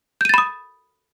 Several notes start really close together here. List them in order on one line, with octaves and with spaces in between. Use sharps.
G6 D#7 A6 B5 D#6